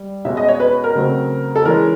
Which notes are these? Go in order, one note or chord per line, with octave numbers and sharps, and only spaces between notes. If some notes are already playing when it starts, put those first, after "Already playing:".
Already playing: G3
B2 G#3 C#4 E5
D#5
C#5
B4
A#4
C#3 F#3 A3 C4
A4
E3 G#3 C#4 A#4